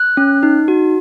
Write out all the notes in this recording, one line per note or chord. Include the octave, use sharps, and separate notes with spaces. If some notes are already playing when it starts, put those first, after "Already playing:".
Already playing: F#6
C#4
D#4
F#4